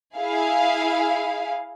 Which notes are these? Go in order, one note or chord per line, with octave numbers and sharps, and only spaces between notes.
E4 G#4 F5